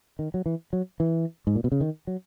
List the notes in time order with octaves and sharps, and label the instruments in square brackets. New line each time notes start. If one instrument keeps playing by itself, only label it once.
[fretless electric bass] D#3
F#3
E3
F#3
E3
G#2
A#2
B2
C#3
D#3
F#3